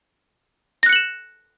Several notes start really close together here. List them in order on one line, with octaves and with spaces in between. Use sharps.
A#6 F#6 C#7 F#7 E7